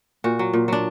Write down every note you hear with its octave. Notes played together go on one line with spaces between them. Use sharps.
A#2 F#4
F#3
A#2
F#3 D4